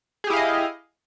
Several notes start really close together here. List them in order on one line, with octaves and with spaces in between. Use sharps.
G#4 G4 E4 F5 D#5